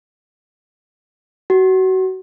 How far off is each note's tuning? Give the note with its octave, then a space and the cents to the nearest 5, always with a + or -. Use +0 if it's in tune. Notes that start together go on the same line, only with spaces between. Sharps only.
F#4 +25